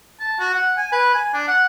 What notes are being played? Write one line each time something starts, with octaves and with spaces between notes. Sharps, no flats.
A5
F#4
F#5
G#5
B4
G#5
D4
F#5